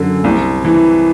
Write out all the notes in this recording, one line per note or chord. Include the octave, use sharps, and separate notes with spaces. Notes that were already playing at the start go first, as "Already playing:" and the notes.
Already playing: F#2 D3
C2
E3